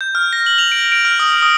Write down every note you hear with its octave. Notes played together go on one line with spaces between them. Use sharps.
G6
F6
A#6
F#7
F7
D7
D7
F6
D#6
D#6